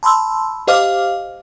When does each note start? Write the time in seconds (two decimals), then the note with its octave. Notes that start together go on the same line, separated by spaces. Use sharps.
0.03 A5 B5 C6 E6
0.67 G4 C5 D#5 F5 D6 F6